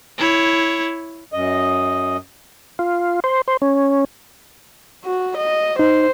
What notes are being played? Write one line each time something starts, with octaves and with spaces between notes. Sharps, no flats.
E4 C#5
F#2 D#5
F4
C5
C5
C#4
F#4
D#5
D#4 C5